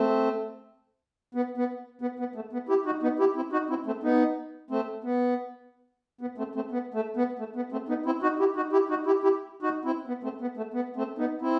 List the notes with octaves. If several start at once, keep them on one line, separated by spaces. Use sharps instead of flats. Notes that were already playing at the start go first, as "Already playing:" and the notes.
Already playing: A3 C4
B3
B3
B3
B3
A3
B3
E4 G4
D#4 F#4
B3 D#4
E4 G4
C4 E4
D#4 F#4
C4 E4
A3 C4
B3 D#4
A3 C4
B3
B3
A3 C4
A3 C4
B3
A3
B3
A3
B3
A3 C4
B3 D#4
C4 E4
D#4 F#4
E4 G4
D#4 F#4
E4 G4
D#4 F#4
E4 G4
E4 G4
D#4 F#4
C4 E4
B3
A3 C4
B3
A3
B3
A3 C4
B3 D#4
C4 E4